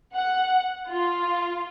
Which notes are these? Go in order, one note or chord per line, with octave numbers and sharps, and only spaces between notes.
F#5
F4